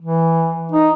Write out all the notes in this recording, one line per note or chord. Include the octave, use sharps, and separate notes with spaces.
E3
D#4